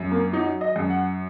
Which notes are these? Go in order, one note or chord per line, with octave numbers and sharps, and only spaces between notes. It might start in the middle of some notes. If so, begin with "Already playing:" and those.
Already playing: F#2
A#3
F#3 D#4
D#5
F#2
F#5